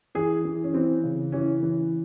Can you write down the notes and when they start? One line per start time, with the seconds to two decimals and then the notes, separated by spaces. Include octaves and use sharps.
0.15 E3 G#4
0.45 E3
0.64 C#4
0.74 E3 C4
1.04 C#3
1.32 E3 C#4
1.63 E3